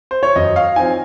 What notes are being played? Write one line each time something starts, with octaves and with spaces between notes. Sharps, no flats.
C5
C#5
F#2 D#5
F5
F3 C4 D#4 G#5